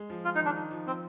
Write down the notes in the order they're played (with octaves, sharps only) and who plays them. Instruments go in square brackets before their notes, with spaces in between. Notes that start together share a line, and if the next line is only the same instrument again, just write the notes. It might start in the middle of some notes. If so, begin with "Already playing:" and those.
Already playing: [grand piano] G#3
F3
[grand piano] G#3 [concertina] F4
[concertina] D#4
[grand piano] D#3 [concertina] D4
[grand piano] D#4
F3
[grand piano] F3 [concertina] C4